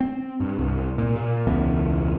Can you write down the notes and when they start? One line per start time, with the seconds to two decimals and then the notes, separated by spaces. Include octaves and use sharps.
0.01 C4
0.40 G2
0.58 C2
0.98 A#2
1.16 A#2
1.47 E1 C#2 E3 B3